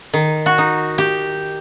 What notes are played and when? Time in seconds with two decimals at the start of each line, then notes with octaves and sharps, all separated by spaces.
0.14 D#3
0.46 F#4
0.58 D#4
0.98 G4